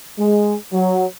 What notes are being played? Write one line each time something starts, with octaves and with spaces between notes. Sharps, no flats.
G#3
F#3